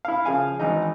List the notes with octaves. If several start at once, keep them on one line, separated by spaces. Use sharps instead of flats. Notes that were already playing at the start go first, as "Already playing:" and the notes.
E4 F5
C#3 F3 G#4 F5 G#5
G#1 E3 D#4